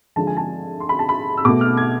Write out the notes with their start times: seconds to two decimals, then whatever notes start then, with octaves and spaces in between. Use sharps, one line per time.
0.16 D3 F3 G#3 A5
0.27 G#5
0.37 A5
0.80 C6
0.89 B5
0.99 A5
1.09 B5
1.37 E6
1.45 B2 A3 D6
1.61 F6
1.77 G#6